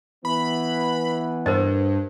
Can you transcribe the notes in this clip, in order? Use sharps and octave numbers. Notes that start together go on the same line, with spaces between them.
E3 B3 B5
G2 A#4 C5 D#5